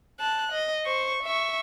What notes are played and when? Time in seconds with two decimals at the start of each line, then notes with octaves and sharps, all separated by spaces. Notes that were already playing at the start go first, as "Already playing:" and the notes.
0.20 A5 F#6
0.52 D#5
0.86 C5 C#6
1.23 E5 C#6